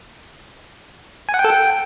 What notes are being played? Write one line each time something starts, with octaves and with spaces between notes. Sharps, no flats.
G#5
F#5
G5
A4
G5